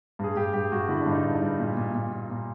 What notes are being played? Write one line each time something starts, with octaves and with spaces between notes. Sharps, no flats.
G2 G#4
G2 G4
G2 G4
G2 F#4
D3 E4
D4
G2
D#4
G2
D#4
G2
A#2
A#2
A#2
A#2
A#2